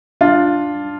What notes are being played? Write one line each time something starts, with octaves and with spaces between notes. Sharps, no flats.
D4 F4